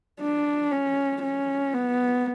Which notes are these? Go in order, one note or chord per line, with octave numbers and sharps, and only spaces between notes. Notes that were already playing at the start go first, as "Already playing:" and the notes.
D4
C#4
C#4
B3